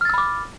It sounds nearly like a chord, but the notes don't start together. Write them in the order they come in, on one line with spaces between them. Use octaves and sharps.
F6 A6 E6 B5 D6